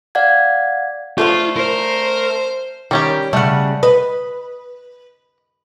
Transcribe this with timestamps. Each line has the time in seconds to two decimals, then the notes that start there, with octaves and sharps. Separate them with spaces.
0.15 D5 F5 F#5 G#6
1.18 D3 F3 A3 F4
1.56 A#4 C5
2.91 D#3 G3 C#4 G4
3.33 C#3 G3 A3 F#5
3.83 B4 D#5